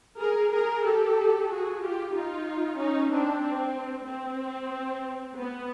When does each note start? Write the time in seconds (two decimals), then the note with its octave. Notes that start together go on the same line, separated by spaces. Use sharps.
0.19 G#4 A#4
0.52 G#4 A#4
0.84 G4 A4
1.48 F#4 G#4
1.81 F4 G4
2.13 D#4 F4
2.78 C#4 D#4
3.11 C4 D4
3.43 C4
4.07 C4
5.37 B3